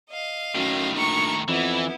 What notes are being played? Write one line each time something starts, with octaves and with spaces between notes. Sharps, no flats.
D#5 F5
F#2 A2 D#3
A#1 A#5 C#6
F2 E3 B3 E4